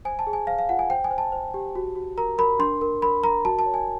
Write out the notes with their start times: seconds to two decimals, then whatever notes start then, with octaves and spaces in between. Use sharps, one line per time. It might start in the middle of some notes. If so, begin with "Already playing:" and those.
0.05 C5 G#5
0.19 A5
0.27 G#4
0.33 G#5
0.47 C5 F5
0.59 F5
0.69 F4 F#5
0.79 G#5
0.90 C5 G5
1.04 G#5
1.11 C5
1.18 A5
1.32 C5
1.54 G4
1.75 F#4
1.96 F#4
2.17 A#4 A#5
2.38 A#4 B5
2.59 D4 C6
2.81 A#4
3.02 A#4 B5
3.24 A#4 A#5
3.45 F#4 A5
3.59 A5
3.66 C#5
3.74 G#5